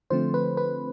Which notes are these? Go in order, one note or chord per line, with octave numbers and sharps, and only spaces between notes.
D3 F3 A3 C4 C5
B4
B4